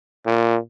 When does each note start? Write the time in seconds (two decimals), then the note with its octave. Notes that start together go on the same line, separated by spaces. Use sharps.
0.26 A#2